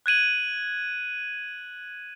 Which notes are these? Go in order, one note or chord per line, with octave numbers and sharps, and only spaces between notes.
F#6 G#6 D#7 F#7